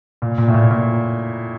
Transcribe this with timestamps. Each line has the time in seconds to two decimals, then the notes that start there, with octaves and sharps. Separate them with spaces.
0.22 A#2
0.38 A#2
0.48 A2
0.54 A#2
0.71 A#2